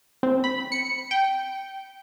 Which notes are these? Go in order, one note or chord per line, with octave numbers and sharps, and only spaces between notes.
C4
B5
C#7
G5